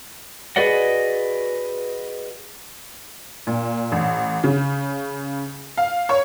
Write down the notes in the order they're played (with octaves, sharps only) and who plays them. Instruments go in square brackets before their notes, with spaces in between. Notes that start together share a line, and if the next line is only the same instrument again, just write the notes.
[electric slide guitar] F#4 G#4 B4 D5 D#5 F#5
[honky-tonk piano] A#2
A1
C#3
F5
C#5